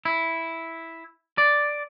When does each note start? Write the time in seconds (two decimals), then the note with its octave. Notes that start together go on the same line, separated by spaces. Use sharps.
0.05 E4
1.38 D5